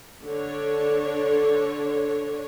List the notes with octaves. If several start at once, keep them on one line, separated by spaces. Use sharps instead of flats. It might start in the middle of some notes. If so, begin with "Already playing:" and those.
D3 D4 C#5